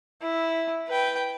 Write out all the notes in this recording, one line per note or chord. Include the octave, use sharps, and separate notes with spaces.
E4
B4 G5